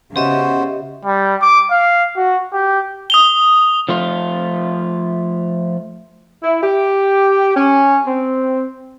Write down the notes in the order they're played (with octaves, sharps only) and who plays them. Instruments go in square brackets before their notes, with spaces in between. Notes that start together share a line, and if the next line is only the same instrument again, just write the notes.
[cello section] C#3 [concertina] B3 F#4 C5 [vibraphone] G4 D#5 E5
[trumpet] G3
D6
F5
F#4
G4
[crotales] D#6 F7 G7
[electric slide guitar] F3 A3 F4
[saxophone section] E4
G4
C#4
C4